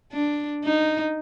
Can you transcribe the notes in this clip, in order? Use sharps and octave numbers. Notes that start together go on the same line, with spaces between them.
D4
D#4